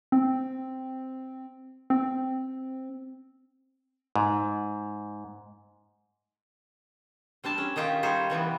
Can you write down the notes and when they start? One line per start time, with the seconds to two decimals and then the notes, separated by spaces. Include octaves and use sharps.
0.12 C4
1.90 C4
4.16 G#2
7.44 G3 C4 D4 A5
7.58 C#4
7.76 D#3 D#4 F4 G4 E5
8.03 G3 D#4 C5 C#5
8.30 C3 E3 G3 B3